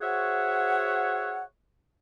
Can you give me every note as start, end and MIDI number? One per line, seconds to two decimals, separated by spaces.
0.01 1.43 66
0.01 1.43 68
0.01 1.43 72
0.01 1.43 73
0.01 1.43 76
0.01 1.43 78